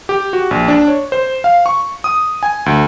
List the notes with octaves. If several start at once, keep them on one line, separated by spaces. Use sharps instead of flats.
G4
F#4
A#1
D4
C#5
C5
F5
C#6
D#6
G#5
D2